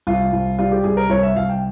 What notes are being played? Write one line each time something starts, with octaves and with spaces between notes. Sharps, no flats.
C2 F4
C2
G3 F4
G4
C2 G#4
A#4
C2 C#5
E5
C2 F5
G5